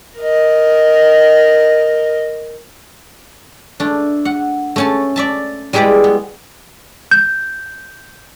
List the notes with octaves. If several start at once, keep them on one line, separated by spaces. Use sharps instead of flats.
A#4 D#5
A3 D4
F#5
A3 C#4 A5
D5 E5 A5
G3 G#3 E4 G4 B4 D5
B3
G6